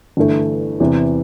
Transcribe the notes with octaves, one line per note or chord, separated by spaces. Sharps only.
G1 G2 E3 A3
E2 C3 E3